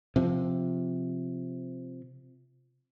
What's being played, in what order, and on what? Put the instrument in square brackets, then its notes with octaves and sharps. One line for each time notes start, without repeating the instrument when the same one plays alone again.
[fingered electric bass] C3 F3